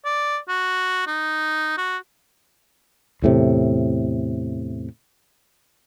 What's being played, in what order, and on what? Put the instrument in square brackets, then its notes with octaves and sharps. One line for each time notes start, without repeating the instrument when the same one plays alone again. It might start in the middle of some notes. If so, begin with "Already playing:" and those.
[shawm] D5
F#4
D#4
F#4
[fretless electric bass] E2 A2 C3